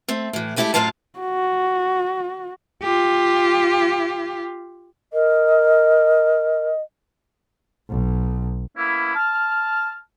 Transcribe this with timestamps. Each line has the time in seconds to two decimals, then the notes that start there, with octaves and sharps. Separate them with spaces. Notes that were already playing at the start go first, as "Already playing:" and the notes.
0.08 A3 C4
0.33 A2 E3
0.56 G#3 A3 E4 F#4 G4 A4
0.74 F#2 A2 F#3 F4 F5 A5
1.19 F#4
2.82 F4 G4
5.13 A#4 D#5
7.90 B1
8.75 A#3 B3 C#4 E4
9.15 A5 F6